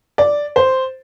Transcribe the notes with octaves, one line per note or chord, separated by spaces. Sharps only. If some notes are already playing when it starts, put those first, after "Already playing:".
D5
C5